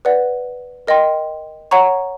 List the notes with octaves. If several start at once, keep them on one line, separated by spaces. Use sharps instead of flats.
B4 D5 F#5
A#4 D#5 G5 C6
C#5 F#5 A#5 C#6